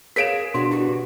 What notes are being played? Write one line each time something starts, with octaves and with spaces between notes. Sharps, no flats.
G#4 A#4 C#5 F5 B6 D7 E7
B2 D4 F#4 C6
E4 F#4 G4